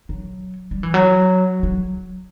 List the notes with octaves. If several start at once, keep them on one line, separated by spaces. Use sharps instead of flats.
F#3
G3
E3
F#3
F#3